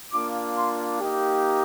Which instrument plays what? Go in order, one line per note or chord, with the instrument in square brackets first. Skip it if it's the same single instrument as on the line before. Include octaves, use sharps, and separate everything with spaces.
[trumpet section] A#3 D4 F4 D6
C6
A#3 D#4 G4